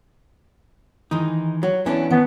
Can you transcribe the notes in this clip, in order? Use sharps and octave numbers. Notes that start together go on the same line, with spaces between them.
D#3 E3 G#3 D#4
F#3
E3 B3 C#4 D4 A5
D#3 B3